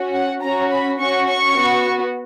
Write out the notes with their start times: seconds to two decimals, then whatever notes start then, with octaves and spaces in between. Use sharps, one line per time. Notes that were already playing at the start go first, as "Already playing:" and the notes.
Already playing: C#4 F#4
0.14 F#5
0.42 C#4 F#4 A#5
0.71 B5
0.99 C#4 F#4 C#6
1.27 C#6
1.56 B3 F#4